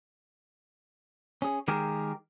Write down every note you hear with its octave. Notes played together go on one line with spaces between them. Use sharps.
C#4 G#4
D#3 G#3 G4 G#4 A#4